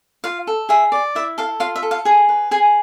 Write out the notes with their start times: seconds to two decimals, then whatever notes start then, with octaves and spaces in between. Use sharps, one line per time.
0.24 F4 F5
0.47 A4
0.69 G#4 E5
0.92 D5
1.15 E4 E5
1.38 A4 F5
1.60 F4 F5
1.76 E5
1.83 A4
1.91 F5
2.05 G#4 G#5
2.29 B4
2.51 G#4 G#5